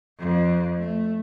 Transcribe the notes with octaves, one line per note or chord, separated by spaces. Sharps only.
F2
A3